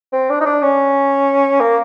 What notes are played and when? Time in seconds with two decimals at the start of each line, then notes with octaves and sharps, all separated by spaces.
0.13 C4
0.30 D4
0.41 D#4
0.46 D4
0.62 C#4
1.61 A#3